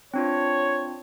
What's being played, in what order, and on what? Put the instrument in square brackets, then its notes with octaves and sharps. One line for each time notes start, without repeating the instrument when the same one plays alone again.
[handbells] C4 D4 F4 [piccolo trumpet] C#5